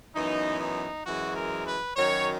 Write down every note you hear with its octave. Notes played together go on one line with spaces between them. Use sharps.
F#2 E3 B3 D#4
D#4
F#2 E3 G#3 F#4
A#4
B4
F#2 D#3 F#3 C#5